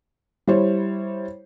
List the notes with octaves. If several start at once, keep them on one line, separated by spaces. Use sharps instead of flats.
G3 E4 C5 C#5